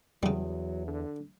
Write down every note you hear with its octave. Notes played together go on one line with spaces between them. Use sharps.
E2 C#3 F#3 G3
D3